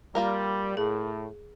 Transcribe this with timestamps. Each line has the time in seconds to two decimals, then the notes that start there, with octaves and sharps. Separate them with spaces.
0.15 G3 A#3 F4 A#4
0.77 A2 G#4